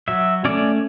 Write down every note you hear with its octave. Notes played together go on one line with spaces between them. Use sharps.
F#3 E5
A3 C#4 D5